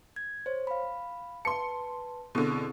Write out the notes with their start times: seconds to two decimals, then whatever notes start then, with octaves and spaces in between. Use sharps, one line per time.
0.16 G#6
0.46 C5 C#5
0.67 F5 B5
1.45 B4 A5 C6 C#7
2.35 B2 D3 C4 E4 G#4